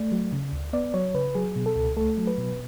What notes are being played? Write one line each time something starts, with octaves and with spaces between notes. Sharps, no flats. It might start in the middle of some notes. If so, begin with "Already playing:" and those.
Already playing: A3 D5
F#3
C#3
D2
B3 D5
F#3 C#5
C#3 B4
F#3 G#4
B2
A4
C#2
A3 A4
F#3
B4
B2